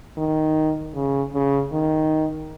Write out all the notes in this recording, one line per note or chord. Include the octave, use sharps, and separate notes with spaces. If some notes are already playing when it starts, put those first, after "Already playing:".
D#3
C#3
C#3
D#3